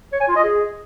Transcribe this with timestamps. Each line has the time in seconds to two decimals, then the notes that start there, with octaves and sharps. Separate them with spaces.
0.12 C#5
0.20 G#5
0.28 F4
0.36 D#5
0.44 G#4